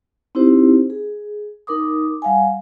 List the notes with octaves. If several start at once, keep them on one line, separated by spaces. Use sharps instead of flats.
C4 D#4 E4 G4 C5
G#4
D#4 A#4 D6 D#6
G3 F5 F#5 G#5